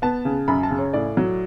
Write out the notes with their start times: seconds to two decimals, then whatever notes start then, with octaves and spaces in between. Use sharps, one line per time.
0.02 B3 A5
0.25 C#3
0.48 F#2 B5
0.63 A5
0.70 C#3
0.79 C#5
0.93 A2 D5
1.17 F#3